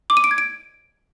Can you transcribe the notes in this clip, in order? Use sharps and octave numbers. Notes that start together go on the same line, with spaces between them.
D6
D#7
D7
G#6
D7